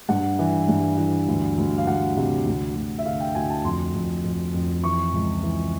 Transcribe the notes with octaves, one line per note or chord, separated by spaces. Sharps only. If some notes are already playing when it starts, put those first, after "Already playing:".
G2 F#5
E3
G2
E3
D2
D2
F5
D2 F#5
C3
D2
D2
E5
D3 F5
G5
D2 G#5
A5
F2 C6
F2
F2
F2
E3 C#6
C#2
E3